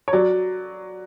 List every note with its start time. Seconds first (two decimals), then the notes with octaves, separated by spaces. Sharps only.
0.08 C#5
0.13 F#3 D5